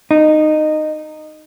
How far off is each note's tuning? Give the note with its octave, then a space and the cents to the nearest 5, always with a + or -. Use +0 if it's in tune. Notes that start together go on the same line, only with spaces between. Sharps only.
D#4 -15